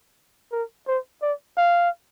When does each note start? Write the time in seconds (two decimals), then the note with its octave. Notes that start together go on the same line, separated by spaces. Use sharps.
0.52 A#4
0.87 C5
1.22 D5
1.57 F5